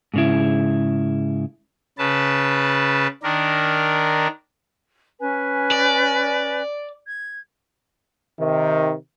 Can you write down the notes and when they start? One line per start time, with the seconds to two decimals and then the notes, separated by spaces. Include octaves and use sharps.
0.14 G#2 C#3 E4
1.98 C#3 B4 A5
3.23 D#3 D4 A#4
5.20 C#4 B4 G#5
5.72 D5
7.07 G#6
8.40 C3 D#3